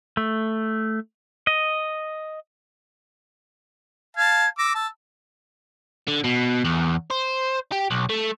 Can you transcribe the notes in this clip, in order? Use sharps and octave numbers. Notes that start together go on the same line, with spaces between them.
A3
D#5
F5 A5 G#6
D6 E6 A#6
A5 E6
D3
B2
E2
C5
G4
B1
A3